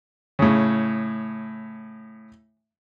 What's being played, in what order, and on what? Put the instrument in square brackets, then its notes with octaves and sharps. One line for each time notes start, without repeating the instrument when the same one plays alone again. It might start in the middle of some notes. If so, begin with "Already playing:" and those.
[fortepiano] A2 C#3